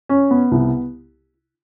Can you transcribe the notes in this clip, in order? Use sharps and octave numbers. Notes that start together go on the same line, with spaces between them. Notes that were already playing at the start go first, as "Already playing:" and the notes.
C#4
B3
C2